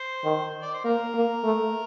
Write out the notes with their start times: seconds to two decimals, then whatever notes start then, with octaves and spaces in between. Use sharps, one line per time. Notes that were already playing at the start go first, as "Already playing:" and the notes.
Already playing: C5
0.24 D#3
0.62 D5
0.74 C5
0.84 A#3 A#4
1.14 A#3
1.44 A3